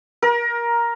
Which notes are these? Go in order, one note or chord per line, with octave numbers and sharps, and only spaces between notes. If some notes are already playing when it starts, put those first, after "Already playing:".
A#4